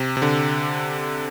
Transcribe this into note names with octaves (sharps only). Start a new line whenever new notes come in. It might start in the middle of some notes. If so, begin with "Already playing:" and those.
Already playing: C3
C3
D3